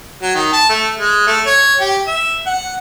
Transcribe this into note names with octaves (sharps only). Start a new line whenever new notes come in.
F#3
D#3
A5
A3
G#3
A3
C#5
G4
E5
F#5